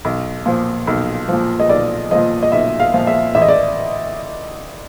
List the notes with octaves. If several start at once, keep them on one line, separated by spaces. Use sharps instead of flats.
B1
A#2 F3
B1
A#2 F3
D#5
B1 D5
A#2 F3 D#5
D#5
B1 E5
F5
A#2 F3
E5
A1 E5
D#5
D5